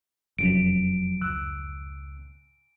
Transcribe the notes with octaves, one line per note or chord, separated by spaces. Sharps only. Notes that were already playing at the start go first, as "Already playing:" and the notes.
F1 F#2 F3 F#3 D7
C#2 E6 F#6